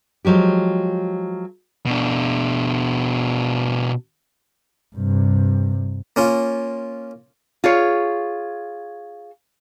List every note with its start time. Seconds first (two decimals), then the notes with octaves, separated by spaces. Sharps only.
0.25 F3 F#3 G#3 G4
1.86 B2 D4
4.96 G2 C3
6.16 A#3 C#4 F4
7.64 F4 G#4 C#5